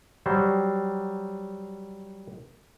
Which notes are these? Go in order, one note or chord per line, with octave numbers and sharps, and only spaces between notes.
F#3 G3 C5